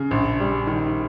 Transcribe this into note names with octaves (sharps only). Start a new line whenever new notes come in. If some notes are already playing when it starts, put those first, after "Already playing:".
Already playing: C#3
A#1
G3
D#3